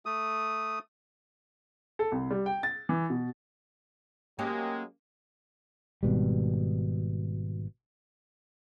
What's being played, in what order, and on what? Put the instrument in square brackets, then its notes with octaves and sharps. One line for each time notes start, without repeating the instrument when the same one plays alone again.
[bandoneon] A3 D#6
[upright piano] A4
C2
G3
G5
A6
E3
B2
[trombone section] F#3 G#3 [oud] A#3 C#4 G4
[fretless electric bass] G#1 B2 G3